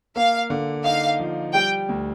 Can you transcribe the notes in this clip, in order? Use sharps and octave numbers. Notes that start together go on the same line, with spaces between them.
A#3 F5
D3
D#4 F5
F3
G3 G5
D2